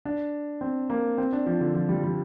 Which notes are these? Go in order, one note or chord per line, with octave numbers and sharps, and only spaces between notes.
D4
C4
A#3
C4
D4
F3
D3
F3
G3
G3